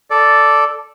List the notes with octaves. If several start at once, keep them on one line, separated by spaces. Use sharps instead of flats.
A4 D5